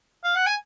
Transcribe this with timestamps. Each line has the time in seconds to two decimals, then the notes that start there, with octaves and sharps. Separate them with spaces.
0.24 F5
0.35 F#5
0.47 G#5